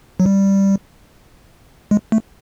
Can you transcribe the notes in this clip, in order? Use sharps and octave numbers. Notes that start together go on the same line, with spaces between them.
F#3
G3
G#3
A3